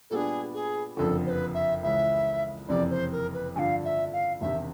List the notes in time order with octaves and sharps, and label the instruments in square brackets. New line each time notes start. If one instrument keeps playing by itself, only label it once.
[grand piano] A#2 G3 B3 D4 [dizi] G#4 A4
[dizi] G#4
[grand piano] F#1 F2 D3 F3 [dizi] A4
[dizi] C5
B4
E5
[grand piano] C#2 C#3 E3 G#3 [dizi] E5
[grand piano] F#1 F2 C3 E3 [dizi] D5
[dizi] C5
A#4
B4
[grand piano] G2 D3 F3 [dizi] F5 G#5
[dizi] E5
F5
[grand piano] E1 E2 C3 D#3 [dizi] E5